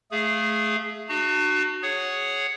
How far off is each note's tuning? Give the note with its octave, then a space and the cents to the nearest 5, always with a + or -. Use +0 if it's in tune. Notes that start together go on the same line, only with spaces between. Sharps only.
A3 -15 G#4 +0 F5 -20
D4 +45 F#4 +0 A5 +45
G#4 +0 C#5 +0 F#5 +0